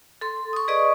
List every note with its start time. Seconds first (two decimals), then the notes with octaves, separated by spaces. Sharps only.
0.21 A4 C6
0.53 C#6 D#6
0.68 G#4 B4 D5 D#5 C#6 D#6